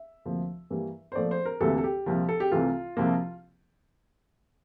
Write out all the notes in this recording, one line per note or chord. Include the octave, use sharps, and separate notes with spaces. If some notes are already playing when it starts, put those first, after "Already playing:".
Already playing: E5
D2 C3 F3 A#3
G2 E3 G3 A#3
C5
A#2 F3 A3 D5
C5
A#4
D2 C3 E3 G3 A#3 A4
A4
G4
C2 A#2 F3
A4
G4
C2 C3 E3 A3 F4
C2 C3 F3 A#3